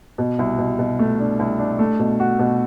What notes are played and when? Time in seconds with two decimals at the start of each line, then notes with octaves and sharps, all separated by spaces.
0.18 B2
0.39 C2
0.58 B2
0.79 B2
0.99 A3
1.20 D4
1.39 C2
1.59 D4
1.79 A3
1.99 B2
2.20 F#4
2.39 B2